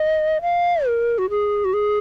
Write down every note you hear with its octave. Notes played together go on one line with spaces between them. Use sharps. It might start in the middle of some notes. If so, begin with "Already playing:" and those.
Already playing: D#5
F5
A#4
F#4
G#4
F#4
G#4